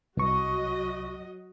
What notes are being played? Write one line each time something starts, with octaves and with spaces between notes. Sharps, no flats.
C2 F#3 F#4 D#5 C#6